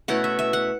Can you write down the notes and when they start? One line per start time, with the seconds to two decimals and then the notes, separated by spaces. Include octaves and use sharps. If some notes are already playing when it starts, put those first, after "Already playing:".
0.08 B2 A3 C#4 E4 F#5
0.24 E5
0.39 E5
0.53 F#5